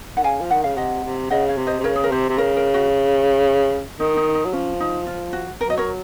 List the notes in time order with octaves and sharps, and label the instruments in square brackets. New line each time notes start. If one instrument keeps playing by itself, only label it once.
[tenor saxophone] D#3 [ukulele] F#5
[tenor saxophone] C#3 [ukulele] F5 G#5
[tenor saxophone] F3
[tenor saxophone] D#3 [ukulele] F#5
[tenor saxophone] C#3 [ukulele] F5
[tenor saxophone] C3 [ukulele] D#5 F#5
[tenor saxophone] C3
[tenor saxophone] C#3 [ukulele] D#5 F#5
[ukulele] C#5 F5
[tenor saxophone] C3
[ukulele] C5 D#5
[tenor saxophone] C3
[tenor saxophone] C#3 [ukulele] A#4 C#5
[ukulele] G#4
A#4
[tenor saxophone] C3 [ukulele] C5
[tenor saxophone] C3
[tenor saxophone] C#3 [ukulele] A#4
[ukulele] A#4
F#4
[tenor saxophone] D#3 [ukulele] D#4
[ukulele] D#4
D#4
[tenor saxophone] F#3
[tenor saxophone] F3 [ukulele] C#4
[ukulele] D#4
F4
F#4
[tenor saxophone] F#3 [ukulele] A#4
[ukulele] D#5
A#4 C#5